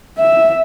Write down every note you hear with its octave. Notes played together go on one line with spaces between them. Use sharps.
E5